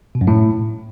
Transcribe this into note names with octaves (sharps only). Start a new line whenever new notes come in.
B2
F#2
A2